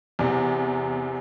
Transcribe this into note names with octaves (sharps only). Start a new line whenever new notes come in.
E2 C3